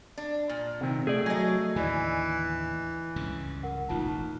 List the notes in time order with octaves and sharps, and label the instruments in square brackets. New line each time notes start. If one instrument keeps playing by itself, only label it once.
[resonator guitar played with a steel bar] D4
A#2
[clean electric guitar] C3 D#3 C4
[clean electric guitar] A3 [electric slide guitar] G#4 D5
[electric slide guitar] F#3 [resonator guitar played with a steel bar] G#4 D#5
[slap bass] D#2 A2 D3 [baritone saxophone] E3 [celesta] D5 D#5 G#5
[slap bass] C#2 G2 C#3
[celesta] A#4 F#5
[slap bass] E1 A1 D#2 [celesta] D#4 F4 A5